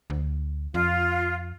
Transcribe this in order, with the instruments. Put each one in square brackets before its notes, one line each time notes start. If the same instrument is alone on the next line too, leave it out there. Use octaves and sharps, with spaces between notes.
[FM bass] D2
[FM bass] F2 [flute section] F4